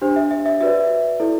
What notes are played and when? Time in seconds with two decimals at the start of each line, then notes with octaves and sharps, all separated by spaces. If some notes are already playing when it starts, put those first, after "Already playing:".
0.01 D4 G4 C5
0.16 E5
0.31 E5
0.46 E5
0.60 F#4 B4 D5 E5
1.20 E4 A4 D5